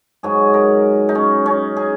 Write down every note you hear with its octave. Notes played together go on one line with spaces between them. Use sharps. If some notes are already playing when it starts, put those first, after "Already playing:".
G#2 F#3 G#4
A#4
D#4
C#4
C#4
G#4